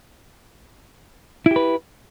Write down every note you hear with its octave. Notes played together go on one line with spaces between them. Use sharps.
E4 G4 B4